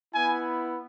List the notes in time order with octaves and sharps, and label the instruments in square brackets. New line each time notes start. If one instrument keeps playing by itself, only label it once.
[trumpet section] B3 E4 G#5